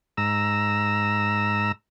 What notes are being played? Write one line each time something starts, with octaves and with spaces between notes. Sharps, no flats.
G#2 A#5 E6